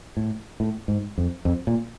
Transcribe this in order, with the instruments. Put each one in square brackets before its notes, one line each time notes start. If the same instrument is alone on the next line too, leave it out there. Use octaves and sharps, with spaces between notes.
[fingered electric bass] A2
A2
G#2
F2
F2
A#2